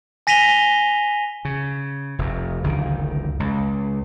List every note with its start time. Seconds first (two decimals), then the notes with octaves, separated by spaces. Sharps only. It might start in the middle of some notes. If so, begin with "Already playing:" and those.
0.27 G#5 A#6 B6 D#7 F7 G7
1.45 C#3
2.19 F1 F2
2.64 F#1 C#2 D3 D#3
3.40 C#2